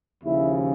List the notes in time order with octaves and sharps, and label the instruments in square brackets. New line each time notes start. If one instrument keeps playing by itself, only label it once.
[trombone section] D#2 C#3 F3 E4